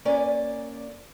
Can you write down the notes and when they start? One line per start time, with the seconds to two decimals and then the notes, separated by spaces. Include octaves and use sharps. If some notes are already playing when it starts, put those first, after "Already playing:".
0.05 A#3 C#4 D5 G#5